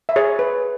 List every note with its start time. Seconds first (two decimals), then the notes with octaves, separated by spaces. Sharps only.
0.09 E5
0.16 G#4 C#5
0.39 B4